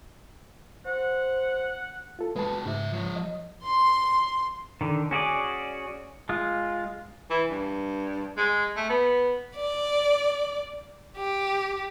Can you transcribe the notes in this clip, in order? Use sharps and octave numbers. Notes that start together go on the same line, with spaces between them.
C5 F#5
F4 A4
G#3 F#4 B4 A5
G#2 C#3 E5
F3 C#5
D#5
C6
D3 D#3
C#4 F#4 G#4 D5
G#3 F4
E3
G2
G#3
A3
B3
D5
G4